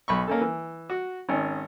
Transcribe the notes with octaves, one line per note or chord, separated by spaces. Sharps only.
B1 B5 C#6
A#3 C#4 A4
E3
F#4
G#1 D#3 C#4